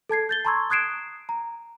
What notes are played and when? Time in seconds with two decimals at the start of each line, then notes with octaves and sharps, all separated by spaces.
0.09 A4 A5 G#6 C7
0.29 G6 A6 G7
0.45 A5 A#5 C6 C#6 E6 G#6
0.70 D#6 F#6 G#6 C7 D7 E7
1.29 A#5